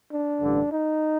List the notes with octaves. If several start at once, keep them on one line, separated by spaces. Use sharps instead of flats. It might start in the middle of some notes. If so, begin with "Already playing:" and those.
D4
A1 G2 D3
D#4